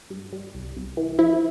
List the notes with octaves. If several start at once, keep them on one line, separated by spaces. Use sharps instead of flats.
G2
G3
C2
C2
E3
F3 E4